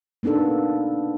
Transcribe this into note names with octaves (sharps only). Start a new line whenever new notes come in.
A#3 B3 D4 D#4 A4